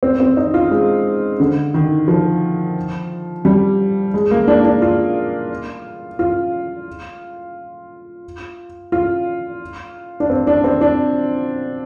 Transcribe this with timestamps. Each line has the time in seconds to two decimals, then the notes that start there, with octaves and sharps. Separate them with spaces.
0.03 C4
0.20 C4
0.37 D#4
0.54 F4
0.71 G#3
1.40 D3
1.74 D#3
2.08 F3
3.45 G3
4.14 G#3
4.31 A#3
4.48 D4
4.65 D4
4.82 F4
6.19 F4
8.92 F4
10.20 D4
10.30 C4
10.47 D4
10.64 C4
10.81 D4